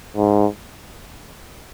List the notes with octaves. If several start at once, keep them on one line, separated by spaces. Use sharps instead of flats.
G#2